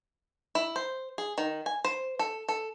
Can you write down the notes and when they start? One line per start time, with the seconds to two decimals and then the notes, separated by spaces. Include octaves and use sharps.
0.55 E4
0.76 C5
1.18 G#4
1.38 D#3
1.66 G#5
1.85 C5
2.19 A4
2.49 A4